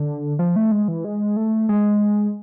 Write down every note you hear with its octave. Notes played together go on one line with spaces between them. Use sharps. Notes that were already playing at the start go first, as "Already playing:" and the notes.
Already playing: D3
F3
A3
G#3
E3
G#3
A3
G#3